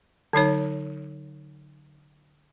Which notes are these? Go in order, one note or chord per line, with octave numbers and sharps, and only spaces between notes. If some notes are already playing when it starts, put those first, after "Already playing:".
D3 F#3 D#4 C#5